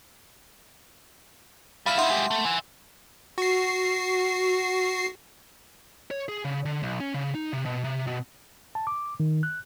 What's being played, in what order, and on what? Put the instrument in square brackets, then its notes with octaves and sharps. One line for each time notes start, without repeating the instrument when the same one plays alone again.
[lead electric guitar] G3 E5 [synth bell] F5 B5 F6
[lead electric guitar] D#4 E4 [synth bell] E5 F#5 C6
[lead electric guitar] G#3 G4
A3
E5 G#5
[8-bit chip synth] F#4 C7
[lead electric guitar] C#5
G#4
C#3
D3
B1
C#4
C#3
D#4
C3
B2
C3
B2
[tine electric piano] A5
D6
D#3
F#6